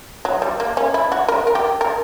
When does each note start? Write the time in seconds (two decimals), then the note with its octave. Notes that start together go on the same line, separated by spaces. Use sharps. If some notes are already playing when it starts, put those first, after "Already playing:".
0.25 F#3
0.42 G3
0.60 A#3
0.77 C#4
0.94 E4
1.12 F#4
1.28 A#4
1.47 A#4
1.55 G4
1.81 A#4